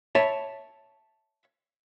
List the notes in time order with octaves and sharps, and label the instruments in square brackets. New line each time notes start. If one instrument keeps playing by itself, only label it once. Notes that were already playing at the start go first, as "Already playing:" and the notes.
[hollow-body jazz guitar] C#5 E5 A5 B5